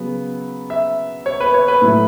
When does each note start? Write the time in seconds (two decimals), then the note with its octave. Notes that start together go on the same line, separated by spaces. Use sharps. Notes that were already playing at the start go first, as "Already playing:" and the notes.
Already playing: C#3 F#3 B3
0.70 E5
1.26 C#5
1.40 B4
1.54 C#5
1.68 B4
1.82 A2 F#3 A3